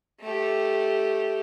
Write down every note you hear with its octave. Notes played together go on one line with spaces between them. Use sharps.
A3 G4